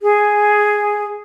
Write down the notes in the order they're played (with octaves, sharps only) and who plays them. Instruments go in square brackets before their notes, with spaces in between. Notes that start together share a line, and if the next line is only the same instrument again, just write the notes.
[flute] G#4